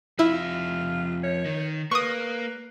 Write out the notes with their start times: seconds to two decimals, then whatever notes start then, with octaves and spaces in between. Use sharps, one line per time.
0.19 F2 E4 F4 E5
1.24 C#5
1.46 D#3
1.91 A#3 B4 C#6 D#6